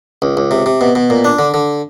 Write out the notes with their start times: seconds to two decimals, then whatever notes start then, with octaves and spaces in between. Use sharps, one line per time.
0.22 C#2
0.37 C#2
0.51 C3
0.66 C3
0.81 B2
0.95 B2
1.10 A#2
1.24 D4
1.39 D3
1.54 D3